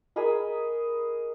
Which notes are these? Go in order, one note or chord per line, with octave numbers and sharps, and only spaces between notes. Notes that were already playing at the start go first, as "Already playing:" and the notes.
G#4 A#4 D#5 B5